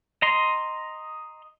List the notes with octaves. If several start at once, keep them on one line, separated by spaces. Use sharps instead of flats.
D#5 A#5 C6